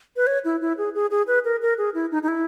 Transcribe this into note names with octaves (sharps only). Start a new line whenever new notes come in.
B4
C#5
E4
E4
G#4
G#4
G#4
B4
A#4
A#4
G#4
E4
D#4
D#4
E4